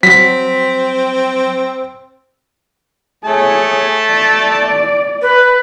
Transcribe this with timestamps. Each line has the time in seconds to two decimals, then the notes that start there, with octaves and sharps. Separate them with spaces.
0.03 F#3 C4 B6
3.24 A3 G#4 C#5 A5
4.10 D5
5.22 B4